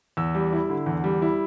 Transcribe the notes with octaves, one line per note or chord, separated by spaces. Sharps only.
E2 E6
G3
E4
D3
E2
G3
E4